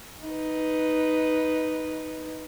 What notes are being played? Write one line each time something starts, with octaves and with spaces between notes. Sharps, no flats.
D#4 B4